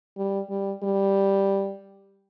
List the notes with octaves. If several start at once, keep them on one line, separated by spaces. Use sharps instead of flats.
G3
G3
G3